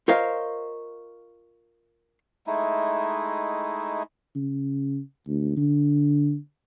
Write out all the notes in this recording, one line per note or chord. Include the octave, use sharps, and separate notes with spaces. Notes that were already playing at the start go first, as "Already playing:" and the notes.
F4 A#4 C5 C#5 D#5 F5
G#3 A3 D#4 E4
C#3
D2
D3